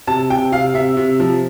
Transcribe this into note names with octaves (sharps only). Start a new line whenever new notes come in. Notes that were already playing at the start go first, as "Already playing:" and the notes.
C3 A5
C3 G5
C3 F5
C3 E5
C3
F3